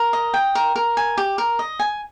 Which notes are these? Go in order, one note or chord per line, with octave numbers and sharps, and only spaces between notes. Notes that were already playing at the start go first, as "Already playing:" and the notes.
Already playing: A#4
D#5
G5
A#4
A#4
G#5
G4
A#4
D#5
G#5